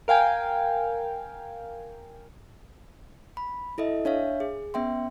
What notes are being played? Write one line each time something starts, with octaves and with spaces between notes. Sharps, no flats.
A#4 F5 G5 G#5
B5
E4 A4 D#5 E5
D4 C#5 E5 F5
G#4
B3 C#4 E5 G5 C6